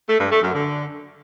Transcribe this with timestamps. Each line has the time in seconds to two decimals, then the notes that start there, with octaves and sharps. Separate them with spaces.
0.09 A3
0.20 G2
0.32 A3
0.43 F#2
0.54 D3